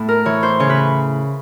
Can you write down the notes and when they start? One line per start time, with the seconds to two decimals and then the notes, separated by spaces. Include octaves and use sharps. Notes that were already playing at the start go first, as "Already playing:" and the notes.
Already playing: A2
0.09 A#4
0.25 E3 C#5
0.43 C5
0.60 C#3 C#5
0.70 B4